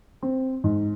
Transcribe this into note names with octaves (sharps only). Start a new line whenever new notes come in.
C4
G#2